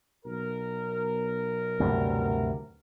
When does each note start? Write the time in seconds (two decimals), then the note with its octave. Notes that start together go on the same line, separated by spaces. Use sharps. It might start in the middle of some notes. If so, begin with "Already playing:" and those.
0.25 B1 A#4
1.80 D2 G2 C3